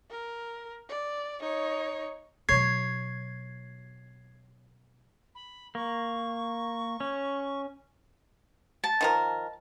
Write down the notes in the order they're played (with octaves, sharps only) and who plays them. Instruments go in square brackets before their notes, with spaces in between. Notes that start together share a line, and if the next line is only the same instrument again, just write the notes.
[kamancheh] A#4
D5
D#4 C#5
[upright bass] B2 F#3 [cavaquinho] C#5 [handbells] G#6 C7
[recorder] B5
[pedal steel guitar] A#3 [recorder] C#6
[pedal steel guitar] C#4
[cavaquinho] A5
[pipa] D#3 F3 A#4